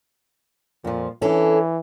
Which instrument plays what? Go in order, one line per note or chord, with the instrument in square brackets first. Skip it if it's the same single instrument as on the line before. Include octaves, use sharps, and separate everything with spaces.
[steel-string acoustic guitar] F2 F3 [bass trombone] A#2
[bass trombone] E3 [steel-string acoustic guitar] C#4 D4 A4